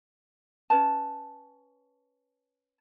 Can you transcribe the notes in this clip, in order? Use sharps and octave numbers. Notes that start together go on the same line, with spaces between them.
C#4 B4 A5